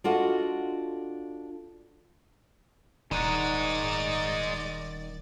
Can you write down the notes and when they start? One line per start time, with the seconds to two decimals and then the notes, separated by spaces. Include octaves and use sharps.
0.04 D4 F4 F#4 A4 D#5
3.11 D#1 D#3 G#3 D#4 D5 F#5